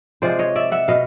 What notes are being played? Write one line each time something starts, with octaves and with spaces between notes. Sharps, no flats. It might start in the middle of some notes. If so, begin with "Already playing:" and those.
C3 F3 G#3 C5 D5
C#5 D#5
D5 E5
E5 F#5
B2 D#5 F5